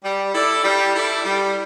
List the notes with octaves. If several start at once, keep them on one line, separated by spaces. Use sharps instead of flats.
G3
E4 A4 D5
G3
E4 A4 D5
G3